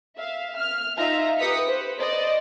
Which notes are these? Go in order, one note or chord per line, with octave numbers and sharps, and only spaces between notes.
E5 F5
F6
D#4 F4 E5 A#5
G4 B4 D#6 B6 C#7
B4 C5
C5 D5 D#5